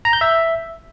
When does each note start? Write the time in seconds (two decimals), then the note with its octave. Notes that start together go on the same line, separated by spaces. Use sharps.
0.05 A#5
0.13 G6
0.21 E5